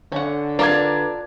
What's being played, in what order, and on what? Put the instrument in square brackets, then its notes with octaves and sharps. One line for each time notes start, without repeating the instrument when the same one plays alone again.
[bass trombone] D3 [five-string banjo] C#4 F#5
[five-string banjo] D4 F4 A#4 [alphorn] B4 [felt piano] A#5 D6 G#6